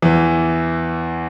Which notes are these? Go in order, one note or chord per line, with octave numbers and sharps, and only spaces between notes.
E2 E3